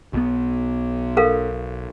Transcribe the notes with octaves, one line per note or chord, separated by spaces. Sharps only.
B1 B2 B3
A4 A#4 F5